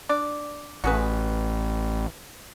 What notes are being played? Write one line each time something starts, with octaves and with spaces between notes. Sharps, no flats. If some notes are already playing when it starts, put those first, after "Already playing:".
D4 D5
A1 F#4 G#4 B4